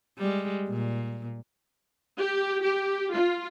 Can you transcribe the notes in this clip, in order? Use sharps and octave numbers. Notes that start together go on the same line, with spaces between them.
G3 G#3
A#2
G4
G4
F4